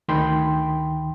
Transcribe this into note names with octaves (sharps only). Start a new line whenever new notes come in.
D2 D#3 G5 B5 C6